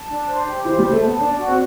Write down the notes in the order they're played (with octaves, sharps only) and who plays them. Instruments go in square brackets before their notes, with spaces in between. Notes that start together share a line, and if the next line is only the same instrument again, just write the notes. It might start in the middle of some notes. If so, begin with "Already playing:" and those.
Already playing: [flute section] A5
D4
C5
G4
[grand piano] E3 [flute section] C5
[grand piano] G3
[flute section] C5
[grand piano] A3
[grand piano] B3 [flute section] A5
[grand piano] D4 [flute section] D5
[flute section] F#4
[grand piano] C4